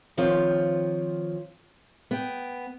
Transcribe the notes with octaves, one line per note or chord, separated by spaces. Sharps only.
D#3 F3 C4 F4 C#5
B3 G5